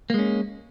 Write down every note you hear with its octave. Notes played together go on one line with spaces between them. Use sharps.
G#3 A#3 C#4